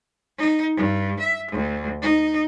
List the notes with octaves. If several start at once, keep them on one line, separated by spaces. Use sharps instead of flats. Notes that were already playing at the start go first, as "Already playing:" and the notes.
D#4
G2
E5
D2
D#4